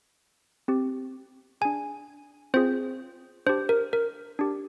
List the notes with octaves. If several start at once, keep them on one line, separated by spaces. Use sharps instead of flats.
C4 G4
D4 G#4 G#5
C4 F4 G#4 C5
D4 G4 C5
A#4
A#4
D4 G4